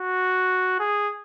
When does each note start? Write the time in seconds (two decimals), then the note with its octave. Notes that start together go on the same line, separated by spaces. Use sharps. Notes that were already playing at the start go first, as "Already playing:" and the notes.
Already playing: F#4
0.80 G#4